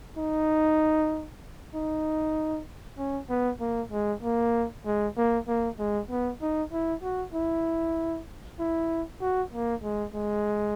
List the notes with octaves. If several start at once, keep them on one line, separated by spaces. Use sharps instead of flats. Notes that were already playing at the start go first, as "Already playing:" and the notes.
D#4
D#4
C#4
B3
A#3
G#3
A#3
G#3
A#3
A#3
G#3
B3
D#4
E4
F#4
E4
E4
F#4
A#3
G#3
G#3